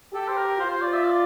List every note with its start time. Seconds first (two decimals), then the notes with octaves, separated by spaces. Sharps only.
0.14 G4 A4
0.28 C5
0.37 A#4
0.59 F4 C5
0.70 C5
0.82 D5
0.93 E5
1.03 D5